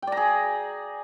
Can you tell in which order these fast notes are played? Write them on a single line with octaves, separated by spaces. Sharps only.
G5 D5 A#5 G#4